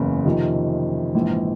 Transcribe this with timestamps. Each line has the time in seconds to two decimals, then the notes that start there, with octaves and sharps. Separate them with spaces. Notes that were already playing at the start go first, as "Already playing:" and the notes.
Already playing: F#1 E2 C#3
0.25 F2 C3 D#3
1.14 A#1 G#2 E3